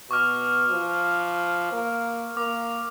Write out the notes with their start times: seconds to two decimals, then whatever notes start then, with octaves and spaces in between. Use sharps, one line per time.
0.11 B2 C#6 D6 F6
0.71 F3
1.73 A#3
2.37 A#3 D6